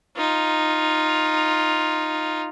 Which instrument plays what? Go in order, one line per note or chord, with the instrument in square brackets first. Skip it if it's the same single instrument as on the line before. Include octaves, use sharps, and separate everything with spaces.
[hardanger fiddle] D#4 F4